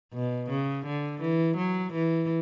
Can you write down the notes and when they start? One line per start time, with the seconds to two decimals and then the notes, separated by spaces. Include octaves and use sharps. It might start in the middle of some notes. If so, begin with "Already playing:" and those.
0.14 B2
0.50 C#3
0.86 D3
1.21 E3
1.57 F#3
1.93 E3